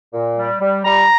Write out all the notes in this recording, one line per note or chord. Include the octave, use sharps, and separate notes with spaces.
A#2
G3
G3
G3 A#5